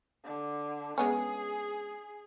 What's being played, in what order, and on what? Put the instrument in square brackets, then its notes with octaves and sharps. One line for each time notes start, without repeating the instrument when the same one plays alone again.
[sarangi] D3
[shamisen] G#3 B3 C#4 [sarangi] G#4